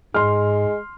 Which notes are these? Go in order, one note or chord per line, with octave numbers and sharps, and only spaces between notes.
G#2 G#3 C6 F6